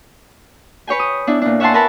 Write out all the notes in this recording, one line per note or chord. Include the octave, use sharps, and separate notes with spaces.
B4 C#5 G5 G#5
D#6
B3 D4 E4
A#2 D4
C#5 E5 F#5 G#5 A5 C6
A#4 B4 C#5 A5 B5